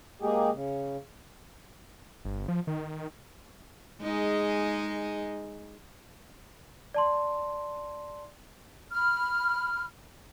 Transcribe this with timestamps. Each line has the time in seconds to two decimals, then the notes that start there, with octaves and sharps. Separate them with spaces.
0.22 G#3 A#3 G4 G#4
0.53 C#3
2.25 G1
2.48 F3
2.67 D#3
4.01 G#3 D#4 G#4
6.94 D5 A5 C6
8.91 B5 F6